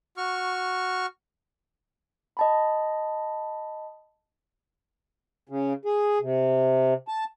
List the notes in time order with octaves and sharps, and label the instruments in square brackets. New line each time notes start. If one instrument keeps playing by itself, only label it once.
[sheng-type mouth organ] F#4 C#6 F6
[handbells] D#5 A5 B5
[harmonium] C#3
G#4
C3
A5